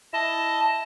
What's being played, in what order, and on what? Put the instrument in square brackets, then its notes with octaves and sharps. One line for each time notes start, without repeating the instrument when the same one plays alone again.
[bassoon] E4 [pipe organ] D#5 A5